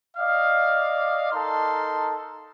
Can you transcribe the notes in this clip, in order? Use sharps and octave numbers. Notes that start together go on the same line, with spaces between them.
D5 D#5 F5
D#4 A4 A#4 A5 C6